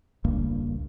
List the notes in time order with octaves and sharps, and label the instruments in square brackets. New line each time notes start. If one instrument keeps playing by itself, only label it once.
[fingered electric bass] E1 C#2 G2 A#3